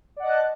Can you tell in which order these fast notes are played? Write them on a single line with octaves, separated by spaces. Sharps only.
D5 F#5 D#5 A5 F#6